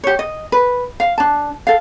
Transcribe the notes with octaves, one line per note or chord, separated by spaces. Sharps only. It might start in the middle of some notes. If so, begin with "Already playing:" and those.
G4 C#5
D#5
B4
F5
D4 A5
A4 F5